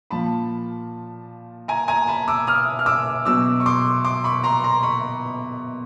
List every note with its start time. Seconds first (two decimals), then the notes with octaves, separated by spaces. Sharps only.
0.11 A#2 F3 A5 B5
1.68 G#5 A#5
1.88 G#5 A#5
2.07 A5 B5
2.28 D6 E6
2.47 D#6 F6
2.79 F6
2.86 D6 E6
3.25 B2 F#3 D6 E6
3.60 C#6
3.66 C6 D6
4.05 C6 D6
4.24 B5 C#6
4.44 A#5 C6
4.64 A#5 C6
4.83 B5 C#6